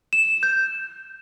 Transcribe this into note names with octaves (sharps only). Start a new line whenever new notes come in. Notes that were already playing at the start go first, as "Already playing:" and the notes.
E7
G6